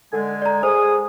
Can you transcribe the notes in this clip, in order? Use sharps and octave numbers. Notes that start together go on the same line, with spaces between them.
D3 G#3 G#5
D5 A#5
G#4 C5 D#6